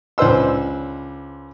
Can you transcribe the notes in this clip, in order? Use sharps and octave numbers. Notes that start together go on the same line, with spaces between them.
C#2 D4 B4 C5 E6